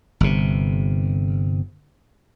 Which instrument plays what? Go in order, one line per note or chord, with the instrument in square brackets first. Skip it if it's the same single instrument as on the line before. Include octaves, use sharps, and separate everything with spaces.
[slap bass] G1 C3